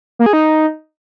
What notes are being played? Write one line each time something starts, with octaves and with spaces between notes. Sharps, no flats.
A#3
G#4
D#4